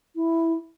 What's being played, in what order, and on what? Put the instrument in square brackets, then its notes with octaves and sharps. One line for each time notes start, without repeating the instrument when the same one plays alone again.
[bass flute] E4